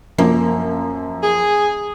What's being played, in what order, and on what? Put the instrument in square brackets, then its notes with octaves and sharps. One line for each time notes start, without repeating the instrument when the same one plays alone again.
[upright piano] F#2 F3 [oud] A#3
[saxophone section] G#4